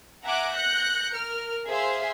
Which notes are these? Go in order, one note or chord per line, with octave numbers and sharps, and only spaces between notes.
E5 F#5 G#5 A#5 D6 F#6
F#6 G6 A#6 C#7
A#4 F6
G#4 C5 E5 F5 C6